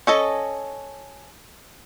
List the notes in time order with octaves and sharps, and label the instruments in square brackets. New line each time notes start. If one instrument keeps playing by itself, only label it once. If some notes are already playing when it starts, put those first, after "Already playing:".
[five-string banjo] C#4 A4 D#5